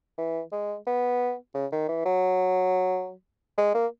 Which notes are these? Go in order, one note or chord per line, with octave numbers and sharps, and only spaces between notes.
E3
G#3
B3
C#3
D#3
E3
F#3
G#3
A#3